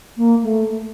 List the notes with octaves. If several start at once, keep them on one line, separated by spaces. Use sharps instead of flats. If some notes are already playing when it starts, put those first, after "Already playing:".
A#3
A3